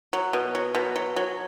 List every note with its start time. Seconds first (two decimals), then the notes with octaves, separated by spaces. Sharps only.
0.13 F#3
0.33 B2
0.55 F#3
0.75 B2
0.96 F#3
1.16 F#3